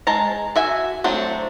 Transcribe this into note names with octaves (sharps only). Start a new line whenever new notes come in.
G#3 A5 A#5
F#4 E5 G#5
F#3 A3 C4 D4